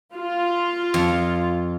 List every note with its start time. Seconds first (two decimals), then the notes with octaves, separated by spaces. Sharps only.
0.15 F4
0.94 F2